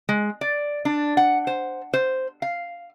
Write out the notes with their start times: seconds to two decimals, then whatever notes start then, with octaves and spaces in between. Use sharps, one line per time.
0.09 G#3
0.41 D5
0.85 D4
1.17 F#5
1.47 C5
1.94 C5
2.42 F5